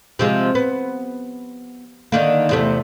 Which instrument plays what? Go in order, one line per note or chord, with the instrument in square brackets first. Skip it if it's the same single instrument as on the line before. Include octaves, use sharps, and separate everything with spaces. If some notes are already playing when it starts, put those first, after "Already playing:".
[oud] C3 F3 G#3
B3
D3 D#3 A#3
E2 C3 A3